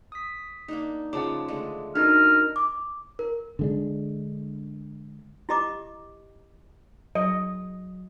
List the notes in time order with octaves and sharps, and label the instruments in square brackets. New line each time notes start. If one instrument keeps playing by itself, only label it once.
[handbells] D#6 B6
[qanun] A#3 D4 D#4
[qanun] C#3 F3 G#3 [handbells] F#5 A5 D6
[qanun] D3 G#3 A3
[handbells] D4 D#4 F#4 [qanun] A4 [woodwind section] A#4 D#5 F6
[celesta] D6
A#4
[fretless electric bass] D3 G#3 D4
[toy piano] E4 G4 D#5 A#5 D6
[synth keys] F#3 [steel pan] D#5